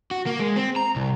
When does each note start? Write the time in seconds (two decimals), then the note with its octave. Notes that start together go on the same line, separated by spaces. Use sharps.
0.11 F#4
0.26 A#3
0.40 G#3
0.56 C4
0.76 A#5
0.96 C2